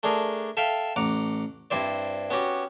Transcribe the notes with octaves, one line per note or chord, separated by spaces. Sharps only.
A3 D4 G#4 A#4
A4 E5 F5 G5
A1 F#5 A#5 D6
G2 C4 E4 C5 D5
B3 C#4 F#4 G4